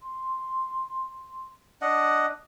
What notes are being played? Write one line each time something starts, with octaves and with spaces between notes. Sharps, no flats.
C6
D4 D#5 F#5